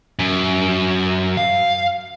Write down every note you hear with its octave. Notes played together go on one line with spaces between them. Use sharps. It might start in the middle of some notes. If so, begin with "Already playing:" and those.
F#2
F5